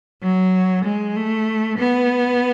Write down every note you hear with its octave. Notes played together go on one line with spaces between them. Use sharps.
F#3
G#3
A3
B3